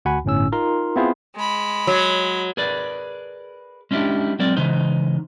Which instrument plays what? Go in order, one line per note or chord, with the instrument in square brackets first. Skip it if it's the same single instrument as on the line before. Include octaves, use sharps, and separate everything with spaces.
[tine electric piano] D2 F#4 F#5 G#5 B5
G1 A2 C#4 E6
D#4 F4 A#4 A#5 C6
B3 C4 E4 F4 G#4 C5
[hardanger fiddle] G#3 B5
[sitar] F#3
[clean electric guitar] G#4 A#4 B4 D5
G#3 C#4 D4 E4 G4
F#3 G#3 C4 A#4 D5
C#3 E3 G#3 D#4 C5